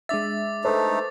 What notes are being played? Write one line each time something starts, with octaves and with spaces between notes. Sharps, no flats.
G#3 D4 E5 D6 A6
A3 D#4 A4 B4 C5